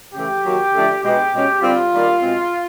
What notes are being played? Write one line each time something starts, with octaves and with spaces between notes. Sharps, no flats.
C#3 E3 A3 G4
D#3 F#3 A#3
D3 F3 A3 D4
B2 G#3 B3 D4 G4
B2 G#3 C#4
D3 G3 C4 F4
D#3 G3 A#3 D4
B2 G#3 C4